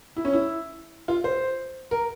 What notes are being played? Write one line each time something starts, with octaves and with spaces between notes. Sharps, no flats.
E4
C#4
E4
F4
C5
A#4